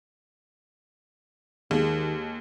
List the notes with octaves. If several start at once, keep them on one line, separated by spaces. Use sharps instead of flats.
D#2 D#3 G#3